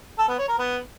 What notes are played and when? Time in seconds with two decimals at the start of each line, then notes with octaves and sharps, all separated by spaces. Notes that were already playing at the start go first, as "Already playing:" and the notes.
0.19 A4
0.29 B3
0.39 C#5
0.49 A#4
0.59 B3